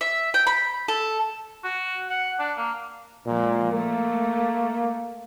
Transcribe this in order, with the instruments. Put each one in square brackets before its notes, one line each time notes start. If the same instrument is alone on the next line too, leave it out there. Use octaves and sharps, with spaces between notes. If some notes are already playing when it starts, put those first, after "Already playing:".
[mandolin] E5
G5
B5
A4
[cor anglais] F#4
F#5
D4
A#3
[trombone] A#2 [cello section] F3 G#3
[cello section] A3 [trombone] A#3